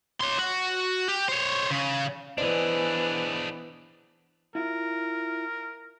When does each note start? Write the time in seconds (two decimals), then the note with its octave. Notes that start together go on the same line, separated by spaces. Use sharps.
0.21 C#5 C6
0.39 F#4
1.08 G4
1.28 C5 C#5
1.71 C#3
2.38 E3 B3 D4 G#4 C5 D5 D#5
4.55 E4 F4 A#4